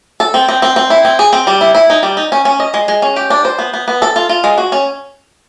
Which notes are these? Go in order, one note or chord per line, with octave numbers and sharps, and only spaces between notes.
A4
C4
C4
C4
C4
E4
C4
G#4
C4
G3
E4
E4
D#4
G3
D#4
C#4
C#4
D#5
G#3
G#3
C#4
G4
D4
C5
B3
B3
B3
A4
F4
F4
G#3
F#4
C#4